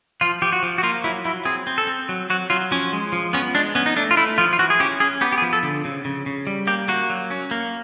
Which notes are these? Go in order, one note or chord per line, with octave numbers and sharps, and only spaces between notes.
F3 F4
F3 G4
F#4
F3
F#4
A#3 F4
F#3 E4
F#3 E4
C4 G#4
C4
A4
C4
F#3
F#3 F#4
F#3 F4
F3 C#4
G#3
F3
B3 C#4
G#3 D4
B3 C#4
D#4
A3 D4
F4
A3 E4
F3 F4
F4
E3 F#4
G#4
C#4 G4
C#4 G#4
B3 G4
G4
G#4
F3
A4
D3
C#3
C#3
C#3
G3
A#3 G4
A#3 F#4
F#3
C#4
A#3